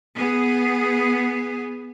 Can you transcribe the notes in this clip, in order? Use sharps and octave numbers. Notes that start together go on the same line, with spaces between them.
B3 G#4